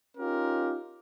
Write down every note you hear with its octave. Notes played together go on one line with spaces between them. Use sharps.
C#4 D#4 F4 G4 A#4